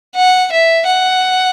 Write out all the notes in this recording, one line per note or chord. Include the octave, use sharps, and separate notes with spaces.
F#5
E5
F#5